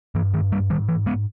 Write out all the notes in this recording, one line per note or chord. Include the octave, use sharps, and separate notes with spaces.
G2 E3
D#3
G3 A#3
G#2 D#3 G3
E3
G#3 B3